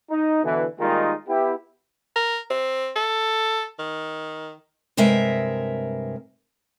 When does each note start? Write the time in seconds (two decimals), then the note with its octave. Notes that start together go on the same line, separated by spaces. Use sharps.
0.10 D#4
0.43 B2 D3 E3
0.80 D#3 G3 G#3 A#3 D#4 F4
1.28 B3 E4 G4
2.16 A#4
2.50 C4
2.96 A4
3.79 D#3
4.97 G2 C3 G#3 A#4 E5